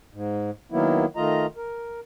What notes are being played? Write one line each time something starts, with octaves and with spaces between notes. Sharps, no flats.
G#2
D#3 F#3 A#3 B3 E4
D#3 A3 F4 D#5 A#5
A#4